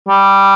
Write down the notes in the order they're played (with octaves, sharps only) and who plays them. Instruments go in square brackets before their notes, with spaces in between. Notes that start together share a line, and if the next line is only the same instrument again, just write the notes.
[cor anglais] G3